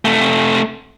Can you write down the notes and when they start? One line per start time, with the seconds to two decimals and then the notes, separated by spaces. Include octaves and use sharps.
0.05 C3 A3